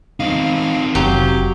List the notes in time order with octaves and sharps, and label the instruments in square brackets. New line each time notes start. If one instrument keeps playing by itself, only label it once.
[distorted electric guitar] C4 D#4 [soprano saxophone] F5
[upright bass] F1 [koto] F#3 [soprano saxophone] G4